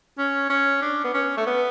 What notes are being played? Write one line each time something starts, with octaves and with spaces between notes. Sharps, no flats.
C#4
C#4
D4
B3
C#4
A3
B3